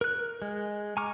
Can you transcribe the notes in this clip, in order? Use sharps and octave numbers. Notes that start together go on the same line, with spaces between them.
A#4 F#6
G#3
G#5 A#5 C#6 D6 F6